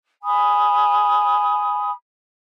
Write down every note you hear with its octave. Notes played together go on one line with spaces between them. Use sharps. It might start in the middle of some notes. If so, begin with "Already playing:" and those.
G#5 B5 D#6